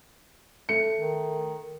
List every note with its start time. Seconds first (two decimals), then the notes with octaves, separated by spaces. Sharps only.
0.69 A3 C#7
0.98 D#3